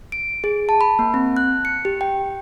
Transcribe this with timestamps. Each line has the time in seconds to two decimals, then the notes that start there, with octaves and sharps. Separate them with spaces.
0.12 D7
0.44 G#4
0.69 A5
0.81 B5
0.99 A#3
1.14 C4
1.37 F#6
1.65 C#7
1.85 G4
2.01 G5